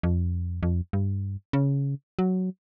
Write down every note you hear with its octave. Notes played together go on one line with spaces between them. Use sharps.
F2
F2
G2
C#3
F#3